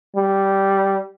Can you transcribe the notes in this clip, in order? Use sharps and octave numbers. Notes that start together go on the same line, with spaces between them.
G3